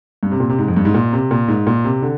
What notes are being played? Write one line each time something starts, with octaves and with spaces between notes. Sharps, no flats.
G2
C3
A#2
C3
G#2
F2
G2
G#2
A#2
C3
A#2
G#2
A#2
C3
D3